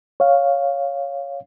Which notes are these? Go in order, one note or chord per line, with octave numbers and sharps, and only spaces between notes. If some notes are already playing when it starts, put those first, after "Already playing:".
C#5 F5